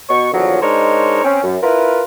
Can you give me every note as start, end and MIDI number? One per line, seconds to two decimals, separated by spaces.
0.10 0.28 47
0.10 0.28 85
0.33 0.60 40
0.33 0.60 46
0.33 0.60 50
0.33 0.60 53
0.33 0.60 54
0.62 1.22 56
0.62 1.22 62
0.62 1.22 63
0.62 1.22 70
0.62 1.22 72
0.62 1.22 73
1.24 1.42 60
1.24 1.42 61
1.44 1.56 42
1.62 2.03 64
1.62 2.03 65
1.62 2.03 70
1.62 2.03 71